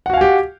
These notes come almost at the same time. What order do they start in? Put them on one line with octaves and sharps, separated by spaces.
F#5 F#4 F5 G#5 G4